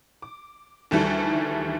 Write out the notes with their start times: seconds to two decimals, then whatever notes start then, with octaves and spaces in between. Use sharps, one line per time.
0.22 D6
0.91 D2 D#3 E3 G3 A4